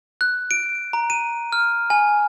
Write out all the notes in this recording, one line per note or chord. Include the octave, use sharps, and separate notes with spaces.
F#6
D7
A#5
D#7
F6
G#5